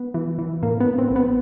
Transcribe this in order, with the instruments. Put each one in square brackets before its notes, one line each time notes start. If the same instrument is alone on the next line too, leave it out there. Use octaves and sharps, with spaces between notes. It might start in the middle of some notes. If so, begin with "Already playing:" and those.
Already playing: [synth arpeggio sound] B3
E3
E3
A2 A#3
B3
A2
C4
A#1
B3